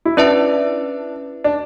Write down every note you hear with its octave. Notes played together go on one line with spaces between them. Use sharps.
E4
C#4 D4 E4 B4 E5 A5
D4